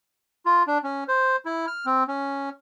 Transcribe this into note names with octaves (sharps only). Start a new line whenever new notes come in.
F4
D4
C#4
C5
E4
F6
C4
C#4